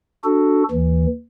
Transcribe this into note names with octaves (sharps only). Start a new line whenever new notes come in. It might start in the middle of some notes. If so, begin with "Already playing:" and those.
D4 F#4 A4
D#2 E3